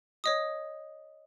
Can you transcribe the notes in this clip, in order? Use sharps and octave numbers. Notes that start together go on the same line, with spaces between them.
C#5 D#5 D#6